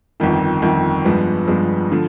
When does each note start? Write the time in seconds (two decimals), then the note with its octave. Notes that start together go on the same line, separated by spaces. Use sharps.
0.20 G1 F2 D#3
0.62 G1 F2 D#3
1.05 G2 F3 G#3 B3
1.47 G2 F3 G#3 B3
1.92 D3 F3